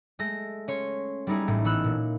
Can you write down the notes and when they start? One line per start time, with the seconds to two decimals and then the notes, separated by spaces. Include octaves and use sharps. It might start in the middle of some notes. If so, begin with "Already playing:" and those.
0.19 G#3 A3 A#6
0.68 C#4 C#5 C6
1.27 G3 B3 D#4 E4 G#4
1.48 A1 A2
1.65 E3 B3 D#4 E6 F#6
1.84 A#2